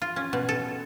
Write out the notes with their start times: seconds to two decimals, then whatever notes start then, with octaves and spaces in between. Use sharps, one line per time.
0.02 F4
0.16 C#4
0.33 B2
0.49 A4